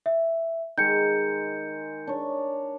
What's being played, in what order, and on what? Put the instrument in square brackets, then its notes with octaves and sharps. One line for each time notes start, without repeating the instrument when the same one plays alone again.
[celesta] E5
[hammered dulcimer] D#3 G#3 [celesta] G6 C#7
[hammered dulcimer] D4 C#5